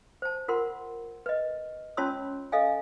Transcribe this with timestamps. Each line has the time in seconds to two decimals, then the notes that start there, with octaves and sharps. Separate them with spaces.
0.22 C5 A5
0.48 F4 A#4 F#5 C6
1.26 B4 D#5
1.97 C#4 F4 C#5 A5 C6 E6
2.52 A4 D#5 F5 G#5